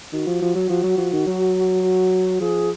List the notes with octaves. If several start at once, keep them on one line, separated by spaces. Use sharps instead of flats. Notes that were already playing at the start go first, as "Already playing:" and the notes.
D#3 F#4
F3
F3
F#3
F3
F#3
F3
D#3
F#3
F#4
F3 G#4